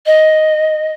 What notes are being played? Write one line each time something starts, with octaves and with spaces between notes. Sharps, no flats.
D#5